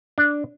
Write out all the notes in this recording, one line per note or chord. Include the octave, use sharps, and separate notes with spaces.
D4